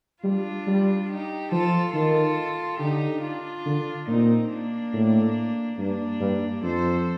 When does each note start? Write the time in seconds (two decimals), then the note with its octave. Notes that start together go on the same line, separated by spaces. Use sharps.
0.24 G3 D4 F4
0.67 G3
1.09 D#4 G4
1.52 F3 F4 A4
1.94 D#3 F4 A4
2.79 D3 D#4 G4
3.22 D4 F4
3.65 D3
4.07 A#2 C4 D#4
4.50 A#3 D4
4.93 A2
5.78 G2 A#3 D4
6.20 G2
6.63 F2 A4 C5